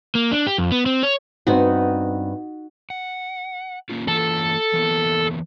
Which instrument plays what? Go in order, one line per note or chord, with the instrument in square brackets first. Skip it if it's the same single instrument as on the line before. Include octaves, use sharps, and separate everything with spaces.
[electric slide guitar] A#3
D4
G4
F2
B3
C4
C#5
[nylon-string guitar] G2 B3 C4 [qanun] D#4 F#4
[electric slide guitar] F#5
A#3 C#4 F4
[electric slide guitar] E3 A#3 F4 [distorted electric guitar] A4
[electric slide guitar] E3 A#3 B3